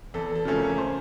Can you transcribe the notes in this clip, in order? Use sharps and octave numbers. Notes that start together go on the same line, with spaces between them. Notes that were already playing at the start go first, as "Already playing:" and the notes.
E2 A4
A4
C#3 F3 A3 C#4
A#4
C5